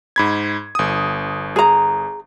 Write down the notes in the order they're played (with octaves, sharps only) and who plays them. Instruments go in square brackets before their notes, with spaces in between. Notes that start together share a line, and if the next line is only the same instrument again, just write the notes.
[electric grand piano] G#2 B5 G#6
G1 D#6
[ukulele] G#4 A#5